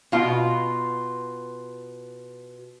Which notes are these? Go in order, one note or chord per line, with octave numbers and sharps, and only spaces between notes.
B2 F4